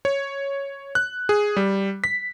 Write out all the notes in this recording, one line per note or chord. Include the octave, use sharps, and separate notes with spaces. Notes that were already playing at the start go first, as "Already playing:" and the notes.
C#5
F#6
G#4
G3
B6